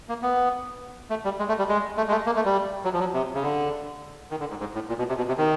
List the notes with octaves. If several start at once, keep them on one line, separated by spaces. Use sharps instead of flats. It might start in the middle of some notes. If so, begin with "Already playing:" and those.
A#3
B3
A3
G3
G#3
A3
G3
G#3
A3
G#3
A3
A#3
A3
G3
F#3
F3
F#3
C3
C#3
D3
D#3
D3
G#2
G#2
A2
A#2
B2
C3
B2
C3
D#3